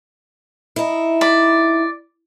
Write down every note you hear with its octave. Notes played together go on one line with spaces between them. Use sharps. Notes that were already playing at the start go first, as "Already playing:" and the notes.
D#4 E4
D5 B5